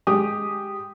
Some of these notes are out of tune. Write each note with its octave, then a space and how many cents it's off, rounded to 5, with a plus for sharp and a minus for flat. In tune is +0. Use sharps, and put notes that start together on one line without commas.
G#3 +0 G4 +0 D#6 -10